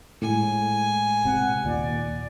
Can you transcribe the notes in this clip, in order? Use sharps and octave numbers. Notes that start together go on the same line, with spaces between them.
A2 G#3 G#5
C3 F#5
D#2 A#2 D5